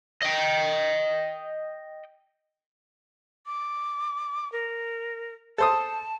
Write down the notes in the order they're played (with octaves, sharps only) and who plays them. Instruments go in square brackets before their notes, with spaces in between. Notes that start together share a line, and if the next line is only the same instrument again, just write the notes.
[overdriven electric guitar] D#5 G5
[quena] D6
A#4
[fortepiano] A4 C5 D#6 [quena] A5